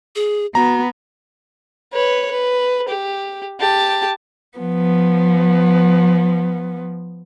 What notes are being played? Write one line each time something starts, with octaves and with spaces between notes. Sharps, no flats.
G#4
B3 F#4 A#5
B4 C#5
B4
G4
G4 A5
F3 B3